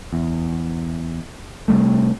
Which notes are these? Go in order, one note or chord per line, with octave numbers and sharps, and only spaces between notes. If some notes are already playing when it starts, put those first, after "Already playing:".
E2
C3 G3 A3